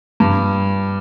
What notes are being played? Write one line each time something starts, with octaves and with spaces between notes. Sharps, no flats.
G2